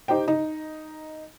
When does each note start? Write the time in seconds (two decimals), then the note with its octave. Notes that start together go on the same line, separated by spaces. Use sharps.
0.08 D#4 G4 C5 G5
0.28 D#4